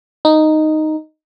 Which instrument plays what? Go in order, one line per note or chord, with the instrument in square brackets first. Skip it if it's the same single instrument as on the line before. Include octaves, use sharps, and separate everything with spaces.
[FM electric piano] D#4